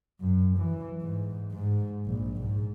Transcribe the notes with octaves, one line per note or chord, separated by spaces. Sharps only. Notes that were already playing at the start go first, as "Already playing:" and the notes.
F#2
E3
G#2
G#2
A#1
G#2